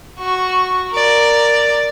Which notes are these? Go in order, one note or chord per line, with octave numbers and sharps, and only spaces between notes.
F#4 C#6
A#4 D5